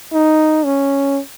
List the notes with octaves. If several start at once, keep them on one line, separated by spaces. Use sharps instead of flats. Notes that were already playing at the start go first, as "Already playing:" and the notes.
D#4
C#4